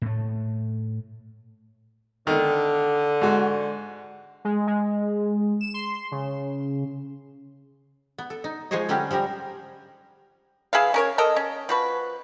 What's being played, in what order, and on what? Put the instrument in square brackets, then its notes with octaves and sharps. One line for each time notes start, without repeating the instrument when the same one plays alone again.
[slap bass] A2 A3
[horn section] D3 [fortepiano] D#3
[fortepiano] G#2 F#4
[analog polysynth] G#3
G#3
E7
C6
C#3
[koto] B3
A4
D#4
F3 G#3 G#4 C5 C#5 D#5
D3 F#3 G3 C#4 D4 G4
F3 G3 G4 A#4
[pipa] E3 G#4 E5 F5
C#4 A#4 C#5
A4 A#4 D#5
C#4
F3 F#4 B4